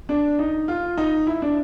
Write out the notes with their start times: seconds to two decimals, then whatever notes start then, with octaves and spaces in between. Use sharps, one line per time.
0.09 D4
0.39 D#4
0.68 F4
0.98 D#4
1.27 E4
1.42 D4